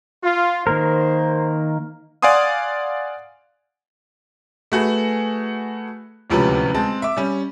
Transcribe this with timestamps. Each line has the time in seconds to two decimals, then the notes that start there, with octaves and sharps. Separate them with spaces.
0.24 F4
0.67 D#3 A#3 A#4 C5
2.22 D5 F5 F#5 G#5 C6 D#6
4.72 A3 F#4 G#4 B4
6.30 D1 C#2 C3 F3 C#4 B4
6.74 G#3 C4 A5
7.02 E5 D6
7.17 G3 C#4